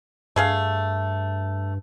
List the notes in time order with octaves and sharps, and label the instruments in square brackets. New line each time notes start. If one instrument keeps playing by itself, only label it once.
[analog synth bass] G2 [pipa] A3 G#4 F5